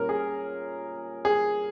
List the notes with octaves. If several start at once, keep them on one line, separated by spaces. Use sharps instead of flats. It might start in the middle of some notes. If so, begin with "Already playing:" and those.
Already playing: A#2 G3 A#3 C#4 A#4
G#4
G#4